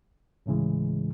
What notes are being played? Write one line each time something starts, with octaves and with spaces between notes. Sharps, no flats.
D2 A2 C#3 E3 G#3